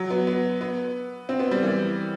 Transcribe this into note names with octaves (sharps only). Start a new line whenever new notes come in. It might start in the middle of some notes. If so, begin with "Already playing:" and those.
Already playing: F#3
B3
B3
B3
C4
B3
G3
E3